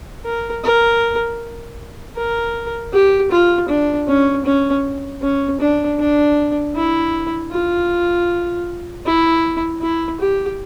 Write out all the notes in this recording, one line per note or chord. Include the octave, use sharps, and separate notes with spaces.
A#4
A#4
A#4
G4
F4
D4
C#4
C#4
C#4
D4
D4
E4
F4
E4
E4
G4